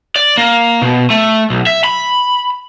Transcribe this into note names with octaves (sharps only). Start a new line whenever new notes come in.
D5
A#3
B2
A3
B1
E5
B5